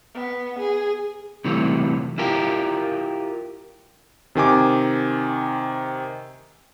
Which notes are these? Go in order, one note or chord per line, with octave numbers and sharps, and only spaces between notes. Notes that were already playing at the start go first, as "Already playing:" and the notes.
B3
G#4
C3 E3 F#3 G3 A3
E4 F4 G4 A#4
C3 D#3 G#5 D6